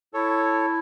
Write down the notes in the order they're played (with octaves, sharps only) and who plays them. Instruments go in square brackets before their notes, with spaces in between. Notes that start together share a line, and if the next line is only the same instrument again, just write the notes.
[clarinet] E4 [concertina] A4 C#5